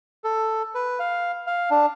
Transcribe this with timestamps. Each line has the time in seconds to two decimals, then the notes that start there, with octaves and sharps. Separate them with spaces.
0.24 A4
0.75 B4
0.99 F5
1.47 F5
1.70 D4